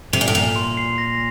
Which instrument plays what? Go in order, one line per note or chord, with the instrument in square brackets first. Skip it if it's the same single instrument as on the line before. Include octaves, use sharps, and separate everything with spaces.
[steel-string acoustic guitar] C3 [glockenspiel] F7
[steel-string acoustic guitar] A#2
A2
[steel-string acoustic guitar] A#2 [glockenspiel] F7
[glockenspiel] C6
C7
A#6